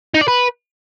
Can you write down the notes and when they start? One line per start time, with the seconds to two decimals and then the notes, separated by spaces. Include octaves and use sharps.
0.15 D#4
0.21 D5
0.28 B4